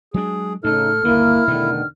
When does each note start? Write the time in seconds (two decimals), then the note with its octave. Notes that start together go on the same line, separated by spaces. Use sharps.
0.14 F#3 G#3 D4 G#4
0.64 A2 C#3 A3 D#4 A4 F6
1.05 G1 D#2 D3 A#3 E4
1.47 E2 B2 D3 D#3 A3